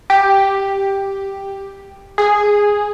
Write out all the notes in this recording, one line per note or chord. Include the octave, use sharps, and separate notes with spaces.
G4
G#4